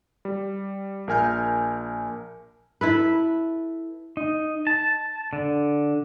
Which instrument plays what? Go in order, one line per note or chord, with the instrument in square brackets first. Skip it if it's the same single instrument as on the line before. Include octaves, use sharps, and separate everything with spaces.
[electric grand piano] G3
A#1 A#4 G#5 F6 G6
[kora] E4 A4 B4
[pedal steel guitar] D#4
A5
D3